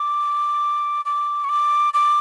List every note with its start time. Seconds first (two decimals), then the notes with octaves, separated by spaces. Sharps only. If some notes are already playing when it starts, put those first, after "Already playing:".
Already playing: D6
1.05 D6
1.44 C#6
1.49 D6
1.94 D6